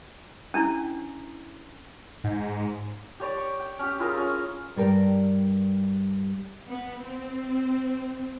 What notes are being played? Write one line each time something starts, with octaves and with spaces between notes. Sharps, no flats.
C#4 D4 E4
G#2
G4 C#5 D5 D6
C#6
G5
C#4 G4
E4 F4 G#4 A#4
C#4 F5
G2 G3 A#4 G5
B3
C4